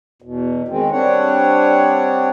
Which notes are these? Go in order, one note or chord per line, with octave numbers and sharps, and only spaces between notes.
E2 B2
D#3 G#3 C4
G3 C4 D4 C#5 F#5